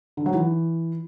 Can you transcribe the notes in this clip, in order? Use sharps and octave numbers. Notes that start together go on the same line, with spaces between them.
D3
F#3
E3